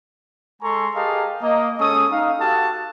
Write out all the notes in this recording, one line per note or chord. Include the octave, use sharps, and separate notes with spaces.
G#3 A4 G#5 A#5 C6 C#6
G4 G#4 A#4 D#5 F5 A5
A#3 D#5
G#3 C#4 A4 C#6 D#6
D#4 F5
F#4 G4 A4 F5 F#5 A5